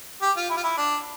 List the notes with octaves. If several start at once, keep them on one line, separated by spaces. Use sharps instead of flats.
G4
F4
E4
F4
E4
D4